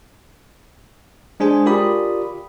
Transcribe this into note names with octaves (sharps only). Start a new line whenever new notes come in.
G#3 D4 G#4 C5 G#5
F4 G4 A#4 D5 B5 D#6